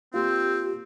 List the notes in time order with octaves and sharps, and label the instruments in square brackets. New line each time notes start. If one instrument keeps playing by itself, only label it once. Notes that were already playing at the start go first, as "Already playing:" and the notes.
[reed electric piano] A#3 F4 [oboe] C4 [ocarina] G4